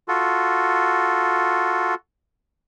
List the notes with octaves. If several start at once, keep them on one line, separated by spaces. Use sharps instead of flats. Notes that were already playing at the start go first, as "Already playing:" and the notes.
F4 F#4 A4